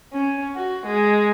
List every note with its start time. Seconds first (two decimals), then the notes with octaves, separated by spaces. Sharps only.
0.13 C#4
0.54 F#4
0.85 G#3